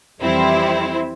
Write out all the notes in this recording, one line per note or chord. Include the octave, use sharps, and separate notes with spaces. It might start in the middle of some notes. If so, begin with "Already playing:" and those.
F2 E3 G3 C4 E4